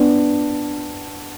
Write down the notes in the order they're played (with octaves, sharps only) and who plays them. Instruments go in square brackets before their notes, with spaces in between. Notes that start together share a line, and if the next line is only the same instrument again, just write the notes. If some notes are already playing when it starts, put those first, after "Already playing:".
Already playing: [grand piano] B3 D4